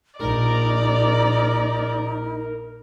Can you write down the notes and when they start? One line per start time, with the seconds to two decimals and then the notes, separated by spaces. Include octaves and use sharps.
0.20 A#1 D#4 A#4 D5